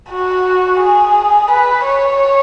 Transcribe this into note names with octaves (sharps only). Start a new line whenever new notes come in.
F#4
G#4
B4
C#5